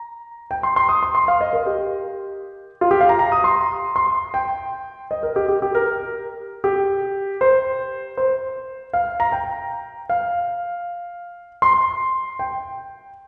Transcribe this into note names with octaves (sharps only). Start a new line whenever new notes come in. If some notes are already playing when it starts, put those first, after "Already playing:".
Already playing: A#5
G5
C6
C6
D#6
C6
C6
F5
D#5
A#4
G4
F4
G4
F5
A#5
A#5
D#6
C6
C6
G5
D#5
A#4
G4
G4
G4
A#4
G4
C5
C5
F5
A#5
G5
F5
C6
G5